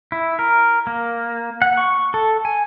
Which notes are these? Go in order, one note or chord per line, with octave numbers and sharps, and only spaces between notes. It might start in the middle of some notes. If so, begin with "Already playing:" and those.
E4
A#4
A#3
F#5
C#6
A4
G#5